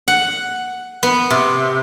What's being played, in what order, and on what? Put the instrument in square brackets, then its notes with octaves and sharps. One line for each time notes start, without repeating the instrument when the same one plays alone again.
[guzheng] F#5
B3
C3